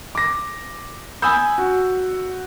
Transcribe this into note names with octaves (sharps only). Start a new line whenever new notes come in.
D6 A#6
G#5 B5 D#6 E6 G6
F#4